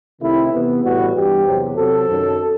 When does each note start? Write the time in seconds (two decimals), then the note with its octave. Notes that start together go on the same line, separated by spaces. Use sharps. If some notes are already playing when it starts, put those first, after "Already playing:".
0.21 C3 D#3 A3 C4 E4
0.53 C3 E3 B3
0.83 A2 E3 G3 B3 F#4
1.15 G2 E3 G3 B3 G4
1.46 E2 C3 F#3 C4
1.77 C3 F#3 C4 A4
2.08 F#2 D#3 F#3